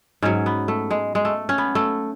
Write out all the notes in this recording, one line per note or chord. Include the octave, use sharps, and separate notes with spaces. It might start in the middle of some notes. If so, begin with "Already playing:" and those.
G#2 F#3 C#4
B3
A3
G#3
G#3
A3
C#4
B3
A3